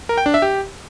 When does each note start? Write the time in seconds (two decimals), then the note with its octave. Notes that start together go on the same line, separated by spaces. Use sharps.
0.09 A#4
0.18 G5
0.26 D4
0.34 E5
0.42 G4